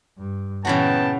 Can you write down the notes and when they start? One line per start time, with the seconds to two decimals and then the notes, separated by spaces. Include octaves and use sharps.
0.18 G2
0.65 A#2 C#3 E3 B3 C#4 F#4 G5 A5